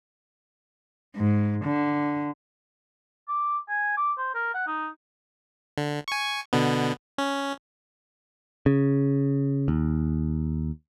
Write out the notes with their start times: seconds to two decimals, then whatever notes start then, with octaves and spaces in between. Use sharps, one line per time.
1.16 G#2
1.65 D3
3.28 D6
3.69 G#5
3.97 D6
4.18 C5
4.35 A#4
4.55 F#5
4.67 D#4
5.78 D3
6.08 G#5 C#6
6.53 B2 D3 B3
7.18 C#4
8.66 C#3
9.68 D#2